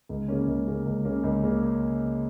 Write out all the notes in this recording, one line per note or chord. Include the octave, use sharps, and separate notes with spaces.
C#2
C#3 A#3 C#4
C#2
C#3 A#3 C#4
C#2
C#3 A#3 C#4
C#2
C#3 A#3 C#4